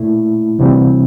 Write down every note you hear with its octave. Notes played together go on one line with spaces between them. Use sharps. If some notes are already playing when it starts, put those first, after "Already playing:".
Already playing: A#2 A3 E4
D2 C3 E3 G3 C4